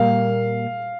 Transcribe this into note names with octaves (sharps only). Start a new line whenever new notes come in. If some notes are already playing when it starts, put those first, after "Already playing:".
Already playing: A#2 G3 A#3 F5